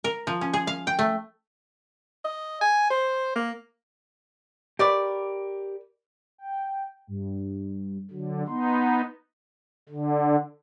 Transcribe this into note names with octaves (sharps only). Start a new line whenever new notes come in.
A#4
F3
C#4
G#4
F5
G5
A3
D#5
G#5
C5
A#3
G4 A#4 B4 D5 D#5 C#6 D6
G5
G2
D3 F#3
B3 D#4 C6
D3